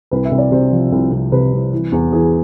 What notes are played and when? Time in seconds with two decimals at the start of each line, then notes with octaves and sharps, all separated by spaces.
0.11 C2 B4
0.25 E5
0.31 C2
0.38 D5
0.51 C3 C5
0.72 F3
0.92 C2
1.12 C2
1.32 C3 B4
1.53 C2
1.72 E3
1.92 E2
2.12 E3 G#4